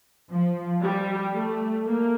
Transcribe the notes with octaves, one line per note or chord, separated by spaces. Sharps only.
F3
G3
A3
A#3